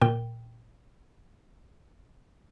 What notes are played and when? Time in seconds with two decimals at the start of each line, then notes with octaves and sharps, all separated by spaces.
0.01 A#2 G5